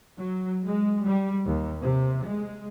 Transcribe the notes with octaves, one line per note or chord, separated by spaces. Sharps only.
F#3
G#3
G3
D#2
C3
G#3